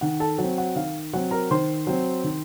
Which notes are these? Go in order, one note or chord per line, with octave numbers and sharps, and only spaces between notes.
D#3 F#5
A4 A5
F#3
C4
F#5
D#3 F5
F#3 C4 F#5
A#4 A#5
D#3 C5 C6
F#3 C4
D#3